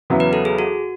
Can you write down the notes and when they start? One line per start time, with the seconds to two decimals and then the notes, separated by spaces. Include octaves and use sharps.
0.10 E2 C#3 F#3 B3 E4
0.20 B4
0.33 A4
0.45 G#4
0.59 F#4